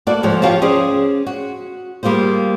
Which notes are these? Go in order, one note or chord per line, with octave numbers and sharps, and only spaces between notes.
A#3 E4 F#4 A4 D5
D2 G#2 F3 A4 C#5
F3 F4 G4 C#5 F5 A5
C#4 G#4 C5 D5
F#4
G3 A#3 F4 G#4 C5